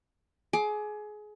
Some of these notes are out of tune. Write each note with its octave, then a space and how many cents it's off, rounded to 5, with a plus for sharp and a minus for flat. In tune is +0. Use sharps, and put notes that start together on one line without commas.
G#4 +25 D6 +15